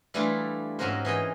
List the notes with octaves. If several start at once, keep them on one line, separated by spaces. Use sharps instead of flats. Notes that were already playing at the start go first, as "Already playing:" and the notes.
E3 G3 A3 D4 E4 F4
G#2 C4 C#4 F#4 A#4 C5
E3 G#4 D#5 G5